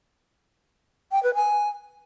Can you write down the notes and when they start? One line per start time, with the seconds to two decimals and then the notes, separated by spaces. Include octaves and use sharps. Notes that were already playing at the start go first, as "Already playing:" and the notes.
1.12 G5
1.23 B4
1.34 G#5